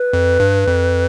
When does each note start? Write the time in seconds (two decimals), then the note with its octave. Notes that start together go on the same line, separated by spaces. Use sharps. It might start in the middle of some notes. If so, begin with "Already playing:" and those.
Already playing: B4
0.13 F2
0.40 G2
0.67 F2